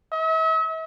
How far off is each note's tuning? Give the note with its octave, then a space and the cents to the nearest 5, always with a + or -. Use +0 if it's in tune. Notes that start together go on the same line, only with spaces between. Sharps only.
E5 -45